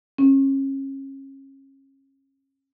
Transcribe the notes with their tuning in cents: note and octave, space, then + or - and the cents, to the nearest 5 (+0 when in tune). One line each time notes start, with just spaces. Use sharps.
C#4 -35